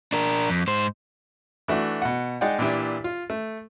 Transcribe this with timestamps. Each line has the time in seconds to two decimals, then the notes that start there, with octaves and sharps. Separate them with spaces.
0.13 D4 A#4
0.50 F2
0.67 G#2 C5
1.68 E3 A3 D4 F#4
2.02 B2 F#5
2.41 G#3 D#4 D5 F#5 G5
2.59 A#2 E3 D4 E4 G4
3.04 F4
3.30 A3